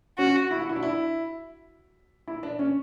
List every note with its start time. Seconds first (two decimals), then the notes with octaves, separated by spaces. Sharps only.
0.18 C#4 F#4
0.51 E4
0.60 F#4
0.69 E4
0.76 D4
0.83 E4
2.28 E4
2.43 D4
2.59 C#4